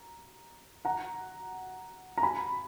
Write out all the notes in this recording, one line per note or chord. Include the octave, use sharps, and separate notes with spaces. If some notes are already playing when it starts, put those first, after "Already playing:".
Already playing: A#5
F#5 A#5
A#5
G#5 B5